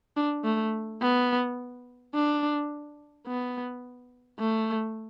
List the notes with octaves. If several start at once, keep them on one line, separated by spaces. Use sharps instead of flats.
D4
A3
B3
D4
B3
A3